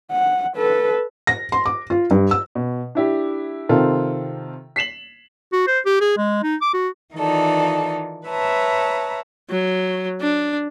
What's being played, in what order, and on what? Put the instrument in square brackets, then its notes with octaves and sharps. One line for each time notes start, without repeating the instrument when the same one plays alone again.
[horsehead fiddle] F#5
A4 B4
[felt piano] A#6
C6
D6
F4
G2
E6
[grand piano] B2
D4 E4 G4
C3 D#3 C4 F4 A4 A#4
B6 C7 E7 F#7
[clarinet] F#4
C5
G4
G#4
G#3
D#4
D6
F#4
[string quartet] D#3 E3 D#4 F4 A4 D5
B4 C#5 E5 A5 A#5
[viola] F#3
D4